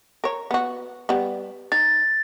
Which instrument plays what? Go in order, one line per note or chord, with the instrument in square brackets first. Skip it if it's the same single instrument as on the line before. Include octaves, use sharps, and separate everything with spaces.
[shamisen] A#4 C#5
B3 F#4
G3 B3
[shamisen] D#4 [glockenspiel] A6